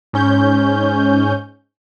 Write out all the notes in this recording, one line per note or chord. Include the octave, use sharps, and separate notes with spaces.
G#2 C#4 G6